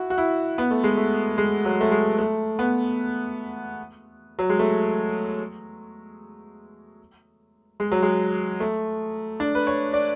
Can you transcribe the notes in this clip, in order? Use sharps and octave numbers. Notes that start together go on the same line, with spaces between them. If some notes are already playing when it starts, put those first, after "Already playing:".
Already playing: E4 F#4
F#4
E4
B3
A3
G#3
A3
G#3
F#3
A3
G#3
A3
B3
F#3
G#3
A3
G#3
F#3
G#3
A3
D4
B4
C#5
D5